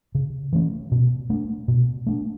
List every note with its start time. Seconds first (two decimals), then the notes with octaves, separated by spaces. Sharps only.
0.15 C#3
0.53 E3 A3 C#4
0.92 B2
1.30 A3 D4
1.68 B2
2.07 A3 D4